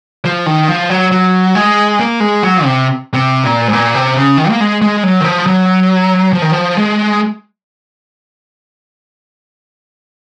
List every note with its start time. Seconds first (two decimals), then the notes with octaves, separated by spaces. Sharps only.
0.25 F3
0.46 D#3
0.68 F3
0.90 F#3
1.12 F#3
1.55 G#3
1.99 A#3
2.20 G#3
2.43 F#3
2.64 C3
3.14 C3
3.44 A#2
3.68 G#2
3.73 A#2
3.95 C3
4.16 C#3
4.37 D#3
4.50 A#3
4.60 G#3
4.82 G#3
5.03 F#3
5.21 D#3
5.24 F3
5.47 F#3
6.33 F3
6.42 D#3
6.52 F3
6.77 G#3